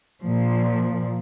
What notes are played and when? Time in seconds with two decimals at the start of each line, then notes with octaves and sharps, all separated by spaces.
0.23 A#2 F3